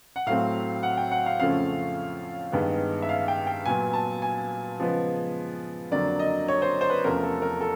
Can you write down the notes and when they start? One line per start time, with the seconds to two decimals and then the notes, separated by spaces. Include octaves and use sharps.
0.16 F#5
0.26 A2 F#3 A3 C4 F5
0.83 F#5
0.97 G5
1.11 F#5
1.26 F5
1.40 F2 C#3 F3 A3 C#4 F5
2.52 G2 D#3 G#3 B3
3.02 E5
3.09 F5
3.28 G5
3.47 G5
3.66 A#2 F#3 B3 G#5
3.93 A5
4.22 G#5
4.79 C#3 F3 G#3 B3
5.91 F2 D3 F#3 A#3 D5
6.19 D#5
6.48 C#5
6.62 C5
6.81 C5
6.90 B4
7.04 E2 C3 F3 A3 C#4 A#4
7.23 A4
7.42 A#4
7.61 A4